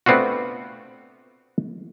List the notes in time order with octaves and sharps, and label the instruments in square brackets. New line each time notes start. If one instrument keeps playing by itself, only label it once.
[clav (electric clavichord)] A3 B3 C4 D4 F4 F#4